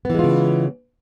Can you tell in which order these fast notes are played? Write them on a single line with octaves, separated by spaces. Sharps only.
B3 E3 G#3 F4 C#3